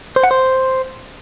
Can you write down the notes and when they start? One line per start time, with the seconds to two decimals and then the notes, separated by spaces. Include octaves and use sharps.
0.16 C5
0.24 F#5
0.31 C5